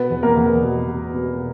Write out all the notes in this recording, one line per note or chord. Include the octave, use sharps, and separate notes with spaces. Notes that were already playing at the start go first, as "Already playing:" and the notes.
Already playing: B2 B3 B4
E2
A#3 A#4
E2
B2
B2
B2